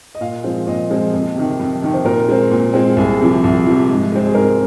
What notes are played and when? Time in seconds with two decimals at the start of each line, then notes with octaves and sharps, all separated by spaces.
0.15 D#5
0.21 A#2 F5
0.44 F3 G#3 C4
0.67 A#2 D#5
0.90 F3 G#3 C4
1.13 F2
1.36 C3 D#3
1.60 F2
1.82 C3 D#3
1.94 C5
2.05 A#2 A#4
2.29 G#3 C4
2.51 A#2
2.74 G#3 C4
2.97 C2 G#4
3.21 C3 F3
3.44 C2
3.67 C3 F3
3.89 G#2
4.12 G#3 C4
4.27 G#4
4.35 G#2 A#4